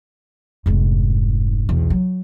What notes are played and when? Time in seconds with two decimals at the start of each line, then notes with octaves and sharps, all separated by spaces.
0.66 F1 G#2
1.69 B1 E2
1.90 F#3